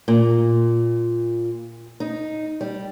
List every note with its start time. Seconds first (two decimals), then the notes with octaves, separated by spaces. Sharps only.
0.08 A#2
2.00 D#4
2.61 G3